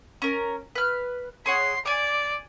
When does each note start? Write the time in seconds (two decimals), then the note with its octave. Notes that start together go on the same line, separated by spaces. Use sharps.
0.22 C#4 A#4
0.75 B4 F6
1.46 G#4 C#5 F#5 C6
1.85 D5 G#5 D6